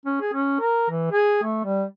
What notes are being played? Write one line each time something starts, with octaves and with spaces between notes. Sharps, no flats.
C#4
G#4
C#4
A#4
E3
G#4
A3
G3